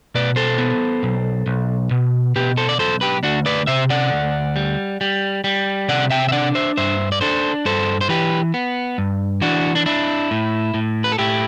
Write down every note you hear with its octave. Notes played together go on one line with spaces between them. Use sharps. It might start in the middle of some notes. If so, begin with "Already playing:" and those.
B2 B4 D5
A4 C5
B3
B1
B1
B2
B2 G4 B4
A4 C5
D5
B1 A4 C5
G4 B4
D2 D4 F#4
B4 D5
C3 C5 E5
D5 F#5
D2
G3
G3
G3
C3 D5 F#5
E5 G5
E5
D4 D5 F#5
C5 E5
G2 C5 E5
D5
D4 A4 C5
G2 A4 C5
C5
E3 G4 B4
B3
G2
E3 D4 F#4
D4
D4 E4
A2
A2
B4
A4
A2 E4 G4